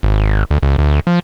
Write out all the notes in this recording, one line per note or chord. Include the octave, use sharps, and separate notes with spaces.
G#1
D2
C#2
D2
F3